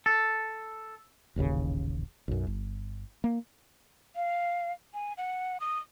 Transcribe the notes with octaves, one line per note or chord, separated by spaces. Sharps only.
A4
D#1 A1 D#2 C#3
B1 F#2
G1
A#3
F5
G#5
F#5
D#6